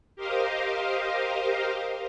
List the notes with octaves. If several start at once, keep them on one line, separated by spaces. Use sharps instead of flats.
G4 A#4 C5 D#5 F5